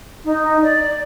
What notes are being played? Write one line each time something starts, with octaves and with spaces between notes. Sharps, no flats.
D#4
D5